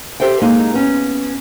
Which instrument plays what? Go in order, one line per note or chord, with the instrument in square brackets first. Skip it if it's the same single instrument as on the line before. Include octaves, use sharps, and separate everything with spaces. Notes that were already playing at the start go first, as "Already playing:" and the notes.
[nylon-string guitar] G4 A4 C5 E5 G5
G#3 A#3 D#4 G#4
B3 C#4